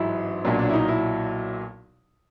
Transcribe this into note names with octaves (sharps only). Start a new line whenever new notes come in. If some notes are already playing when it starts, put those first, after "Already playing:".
Already playing: A1 G#2 F#3 E4
B1 A#2 F#3 D4
D4
E4
D#4
E4